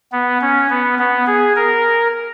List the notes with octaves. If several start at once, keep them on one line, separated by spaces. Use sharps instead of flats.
B3
C#4
B3
B3
G#4
A#4